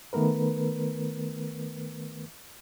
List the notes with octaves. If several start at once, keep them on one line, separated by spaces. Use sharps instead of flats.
D#3 A3 B3 A#4 B4